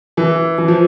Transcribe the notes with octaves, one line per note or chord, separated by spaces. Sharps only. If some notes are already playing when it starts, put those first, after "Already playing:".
E3
E3
F3